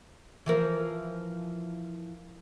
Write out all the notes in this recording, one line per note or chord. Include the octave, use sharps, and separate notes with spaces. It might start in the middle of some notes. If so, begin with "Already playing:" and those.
E3 F3 A#4